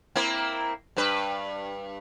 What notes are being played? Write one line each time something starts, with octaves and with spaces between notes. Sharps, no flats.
A#3 C4 E4
G2 B4